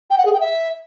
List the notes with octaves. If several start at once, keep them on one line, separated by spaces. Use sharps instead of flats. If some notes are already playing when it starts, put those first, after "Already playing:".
G5
F#5
G#4
G5
E5